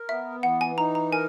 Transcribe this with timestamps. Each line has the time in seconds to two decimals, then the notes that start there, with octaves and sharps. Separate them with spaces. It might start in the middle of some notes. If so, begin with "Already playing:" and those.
Already playing: A#4
0.09 B3 E5
0.43 E3 F#5
0.61 G#5
0.78 D#4 A#5
0.95 A#5
1.12 A#4 G#5